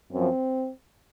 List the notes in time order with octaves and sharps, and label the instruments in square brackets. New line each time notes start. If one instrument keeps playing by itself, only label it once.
[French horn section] F#2 F3 C4